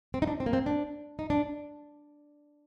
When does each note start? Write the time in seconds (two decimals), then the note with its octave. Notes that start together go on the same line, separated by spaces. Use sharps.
0.14 C4
0.22 D#4
0.27 D4
0.40 C4
0.46 A#3
0.53 C4
0.66 D4
1.19 D#4
1.30 D4